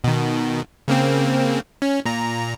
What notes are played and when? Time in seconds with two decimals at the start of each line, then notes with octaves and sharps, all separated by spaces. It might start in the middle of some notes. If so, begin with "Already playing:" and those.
0.04 B2 D#3
0.88 C#3 A#3 C4
1.82 C#4
2.06 A#2 A#5